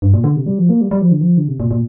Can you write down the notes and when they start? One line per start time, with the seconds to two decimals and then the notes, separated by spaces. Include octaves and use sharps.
0.02 G2
0.14 A#2
0.24 D3
0.36 C3
0.46 G3
0.58 F3
0.69 A#3
0.81 G3
0.91 G3
1.01 F3
1.11 D3
1.21 F3
1.37 D3
1.48 C3
1.60 A#2
1.71 A#2